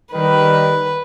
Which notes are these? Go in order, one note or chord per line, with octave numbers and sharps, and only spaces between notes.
D#3 G3 B4